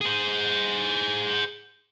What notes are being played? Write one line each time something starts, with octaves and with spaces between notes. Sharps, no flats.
G#4 C5